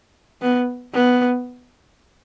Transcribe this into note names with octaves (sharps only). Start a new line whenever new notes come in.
B3
B3